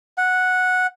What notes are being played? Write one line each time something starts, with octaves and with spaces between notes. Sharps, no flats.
F#5